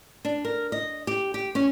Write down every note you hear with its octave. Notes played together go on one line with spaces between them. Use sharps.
D4
A#4
D#5
G4
G4
C#4